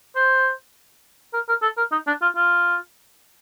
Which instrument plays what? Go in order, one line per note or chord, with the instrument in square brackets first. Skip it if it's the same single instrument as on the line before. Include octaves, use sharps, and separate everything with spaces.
[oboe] C5
A#4
A#4
A4
A#4
D#4
D4
F4
F4